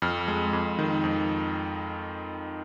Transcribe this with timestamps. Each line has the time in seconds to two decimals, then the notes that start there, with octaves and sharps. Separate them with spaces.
0.02 F2 F6
0.28 G#3
0.53 F2
0.79 D#3
1.04 F2